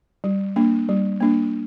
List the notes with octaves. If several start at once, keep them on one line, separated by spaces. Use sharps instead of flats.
G3
A#3 D4
G3
A#3 D4